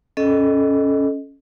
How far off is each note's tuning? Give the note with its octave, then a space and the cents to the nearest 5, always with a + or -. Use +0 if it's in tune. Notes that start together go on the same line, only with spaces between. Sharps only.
C#4 +0 A4 -20 D#5 +0